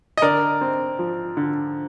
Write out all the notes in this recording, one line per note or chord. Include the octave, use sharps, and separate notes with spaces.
D#5
D3 A#4 D5
C4
F3
D3